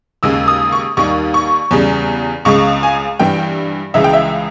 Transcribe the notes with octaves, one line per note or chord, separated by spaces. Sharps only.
D#2 C#3 G#3 E6
D#6
C#6
D#2 D#3 G3 C#6
C#6
E2 C#3 G3
C#2 C#3 G#3 C#6
G#5
G2 E3 G3 G5
C#2 C#3 E3 G#3 E5
G5
E5